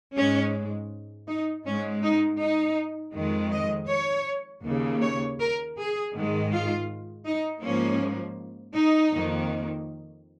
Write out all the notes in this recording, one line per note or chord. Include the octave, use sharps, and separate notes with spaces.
G#2 G#3 C#4
D#4
G#2 G#3 C#4
D#4
D#4
F2 D#3 G#3
D#5
C#5
D#2 C#3 A#3
C#5
A#4
G#4
G#2 D#3 G#3
F4
D#4
G#2 F3 A#3 C#4
D#4
F2 D#3 A#3